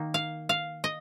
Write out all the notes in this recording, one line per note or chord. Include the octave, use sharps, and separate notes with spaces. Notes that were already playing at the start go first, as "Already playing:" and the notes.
Already playing: D#3 A#3 D#4
F5
F5
D#5